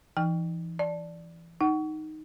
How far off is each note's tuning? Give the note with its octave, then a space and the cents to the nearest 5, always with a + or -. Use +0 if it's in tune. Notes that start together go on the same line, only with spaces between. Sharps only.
E3 +25 D#4 +0 G5 +10
D5 +0 A5 +0
D#4 +0 F#5 +25